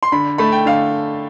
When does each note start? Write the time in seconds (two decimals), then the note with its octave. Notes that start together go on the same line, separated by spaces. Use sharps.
0.03 C6
0.12 D3 B5
0.38 A3 B5
0.52 G5
0.66 D3 F5